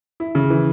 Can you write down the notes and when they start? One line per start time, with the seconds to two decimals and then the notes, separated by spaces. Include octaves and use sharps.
0.20 E4
0.35 C#3
0.50 E3